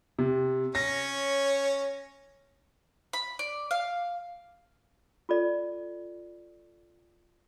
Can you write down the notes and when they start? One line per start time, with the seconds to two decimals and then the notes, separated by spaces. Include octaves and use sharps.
0.19 C3
0.75 C#4 C#5 A#6
3.13 B5
3.39 D5
3.71 F5
5.29 F4 A4 D5